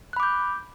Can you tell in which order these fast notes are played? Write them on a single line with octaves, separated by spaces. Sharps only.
F#6 B5 D6 G6